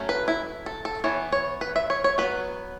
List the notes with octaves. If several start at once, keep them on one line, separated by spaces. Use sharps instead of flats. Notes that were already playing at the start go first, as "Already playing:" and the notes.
Already playing: F#3 A3 C#4
B4
E4
A4
A4
E3 B3 C#5
C#5
B4
E5
C#5
C#5
F#3 B3 B4